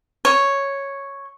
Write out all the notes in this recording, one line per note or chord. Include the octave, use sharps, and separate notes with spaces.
C#5